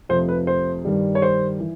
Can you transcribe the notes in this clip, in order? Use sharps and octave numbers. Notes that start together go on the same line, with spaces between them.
F2 C3 F3 A3 C5
B4
C5
G2 D#3 G3
C#5
C5
E3